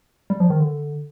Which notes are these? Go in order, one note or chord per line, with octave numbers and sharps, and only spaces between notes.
G3
F3
D#3
D3